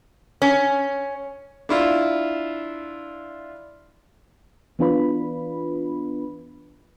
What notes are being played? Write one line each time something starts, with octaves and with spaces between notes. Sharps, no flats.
C#4
D4 E4 F4
E3 B3 D4 F4 B4 B5